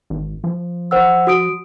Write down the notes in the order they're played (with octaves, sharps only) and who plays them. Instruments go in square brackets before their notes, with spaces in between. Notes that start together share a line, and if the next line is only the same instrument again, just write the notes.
[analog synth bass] G#1
F3
[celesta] C5 F#5 E6
F#4 D#6 D7